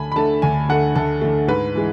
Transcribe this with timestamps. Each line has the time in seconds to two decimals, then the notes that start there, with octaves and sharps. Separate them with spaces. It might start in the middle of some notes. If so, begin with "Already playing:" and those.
Already playing: D2 D3 A3 G#5 A5 B5
0.12 B5
0.16 D3 A3 A5
0.42 D2 G#5
0.69 D3 A3 F#5
0.95 D2 A4
1.21 D3 A3
1.48 G#2 B4
1.75 E3 G#3